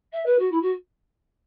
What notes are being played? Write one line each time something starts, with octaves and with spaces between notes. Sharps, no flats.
E5
B4
F#4
E4
F#4